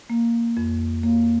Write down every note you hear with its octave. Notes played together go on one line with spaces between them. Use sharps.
A#3
F2
A#3